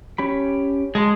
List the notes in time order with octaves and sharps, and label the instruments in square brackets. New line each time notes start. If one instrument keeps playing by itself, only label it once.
[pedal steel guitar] C#4 G4 B5
[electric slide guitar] G#3 [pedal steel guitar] G#4 A5 C6